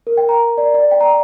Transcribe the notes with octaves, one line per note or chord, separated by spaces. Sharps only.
A#4
G5
A#5
D5
D5
G5
A#5
G5